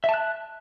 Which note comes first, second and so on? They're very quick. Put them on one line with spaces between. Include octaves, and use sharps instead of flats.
E5 A5 F#6